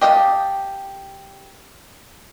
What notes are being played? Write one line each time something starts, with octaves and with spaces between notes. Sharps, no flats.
G4 D#5 F5 F#5 A5